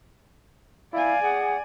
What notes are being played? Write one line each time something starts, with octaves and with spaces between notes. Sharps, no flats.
E4 D5 F5 G#5
G#4 F#5